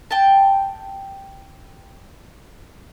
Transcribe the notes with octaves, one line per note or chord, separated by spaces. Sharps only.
G5 A5